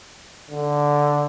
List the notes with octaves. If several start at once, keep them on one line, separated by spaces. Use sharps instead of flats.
D3